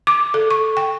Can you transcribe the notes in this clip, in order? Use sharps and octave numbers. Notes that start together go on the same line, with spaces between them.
D6
A4
C#6
G5